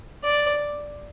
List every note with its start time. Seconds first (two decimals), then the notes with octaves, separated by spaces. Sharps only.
0.24 D5